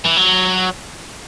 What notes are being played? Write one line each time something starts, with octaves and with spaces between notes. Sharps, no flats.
E3
F#3